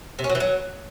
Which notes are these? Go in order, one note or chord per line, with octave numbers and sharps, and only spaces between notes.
C3
C#4
F#3
E3
F#3